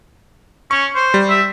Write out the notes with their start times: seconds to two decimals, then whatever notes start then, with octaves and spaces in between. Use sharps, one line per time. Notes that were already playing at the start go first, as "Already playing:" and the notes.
0.71 C#4 C#6
0.95 C5
1.14 G3
1.30 E5